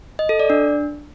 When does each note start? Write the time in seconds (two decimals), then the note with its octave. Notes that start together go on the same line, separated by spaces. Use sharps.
0.19 D#5
0.29 A4
0.39 D5
0.50 D4